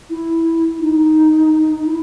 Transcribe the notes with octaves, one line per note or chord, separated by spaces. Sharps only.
E4
D#4
E4